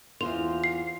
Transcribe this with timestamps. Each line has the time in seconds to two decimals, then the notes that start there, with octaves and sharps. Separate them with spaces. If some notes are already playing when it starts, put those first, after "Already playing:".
0.21 E2 F4 C5 F7
0.64 C7